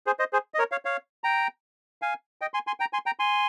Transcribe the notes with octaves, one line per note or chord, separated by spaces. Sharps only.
G#4 C5
C5 D#5
G#4 C5
D#5
A#4 C#5
C#5 F5
C#5 F5
G5 A#5
F5 G#5
D#5 G5
G#5 C6
G#5 C6
G5 A#5
G#5 C6
G5 A#5
G#5 C6